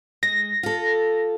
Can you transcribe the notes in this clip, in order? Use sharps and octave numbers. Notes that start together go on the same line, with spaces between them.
G#3 A#6
F4 A4